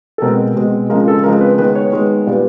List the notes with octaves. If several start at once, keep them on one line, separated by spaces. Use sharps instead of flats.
A4
B2 G#3 C4 A#4
B2 G#3 C4
C#3 F3 G#3 C4 A#4
A4
C#3 F3 G#3 C4 A#4
B4
D#3 G#3 B3 B4
C#5
D#3 G#3 B3
A#2 G3 B3